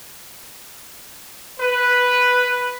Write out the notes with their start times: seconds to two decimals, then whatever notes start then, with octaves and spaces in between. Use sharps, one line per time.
1.60 B4